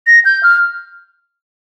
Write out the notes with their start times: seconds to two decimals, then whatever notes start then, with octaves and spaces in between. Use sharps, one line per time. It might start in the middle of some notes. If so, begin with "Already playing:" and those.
0.07 A#6
0.25 G6
0.43 F6